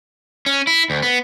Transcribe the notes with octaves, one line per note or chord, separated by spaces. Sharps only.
C#4
E4
D2
B3